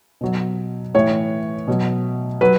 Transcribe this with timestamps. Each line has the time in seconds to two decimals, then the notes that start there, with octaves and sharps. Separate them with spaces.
0.21 B2 F#3
0.95 A2 E3 C#5
1.68 B2 F#3
2.41 F#3 B4